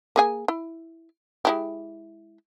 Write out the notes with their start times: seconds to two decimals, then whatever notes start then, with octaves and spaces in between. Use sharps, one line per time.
0.16 A#3 G#4 G#5
0.48 E4
1.45 G#3 E4 G4